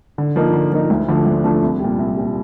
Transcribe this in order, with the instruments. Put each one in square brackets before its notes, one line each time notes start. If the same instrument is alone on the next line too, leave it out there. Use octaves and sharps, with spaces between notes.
[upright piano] D3
F3 A#3 D#4
D3
F3 A#3 D#4
D2
D3 F3 A3 D4
D2
D3 F3 A3 D4
C2
A#2 G3
C2
A#2 G3